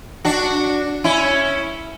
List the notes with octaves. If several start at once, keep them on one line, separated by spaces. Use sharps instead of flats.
D4 F#4
C#4 E4